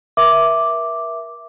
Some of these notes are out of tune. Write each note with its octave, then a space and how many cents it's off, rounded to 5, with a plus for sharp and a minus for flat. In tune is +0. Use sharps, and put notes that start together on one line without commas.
A#4 +40 E5 +0 D6 +0